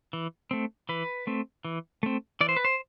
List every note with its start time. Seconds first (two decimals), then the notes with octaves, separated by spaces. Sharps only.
0.13 E3
0.51 A3 C4
0.89 E3 B4
1.27 A3 C4
1.65 E3
2.03 A3 C4
2.41 E3 D5
2.49 C5
2.56 B4
2.65 C5